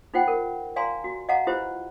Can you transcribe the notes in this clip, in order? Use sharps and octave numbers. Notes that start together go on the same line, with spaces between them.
D#4 F4 C5 F#5 G5
A#4
D5 F5 G#5 A#5 C6
F#4
D#5 F5 F#5 A5 A#5
E4 F4 G4 B4 C5